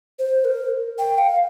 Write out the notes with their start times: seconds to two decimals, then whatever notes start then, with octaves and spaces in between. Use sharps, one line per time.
0.19 C5
0.45 A#4
0.99 G5
1.18 F5